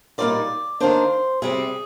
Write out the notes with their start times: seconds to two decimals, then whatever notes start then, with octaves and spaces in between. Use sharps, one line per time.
0.18 A#2 G3 A#3 D#4 D5
0.80 D#3 A#3 D4 C5
1.42 C3 G3 C4 G#4